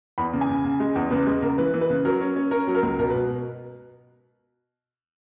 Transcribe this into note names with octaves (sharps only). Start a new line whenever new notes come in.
E2 B5
C#3
G#5
C#3
C#3
G#3
E2
C#3 B4
G#3
C#3 A#4
E3 B4
E3
B4
C#3
F#3 A#4
C#4
C#4
C#4 A#4
F#3
A#4
C#2
B2 A#4
B4
B2